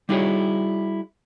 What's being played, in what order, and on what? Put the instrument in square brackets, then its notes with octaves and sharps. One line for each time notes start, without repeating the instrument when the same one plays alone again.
[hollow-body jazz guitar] G3 D#4 E4 F#4 G#4 C#5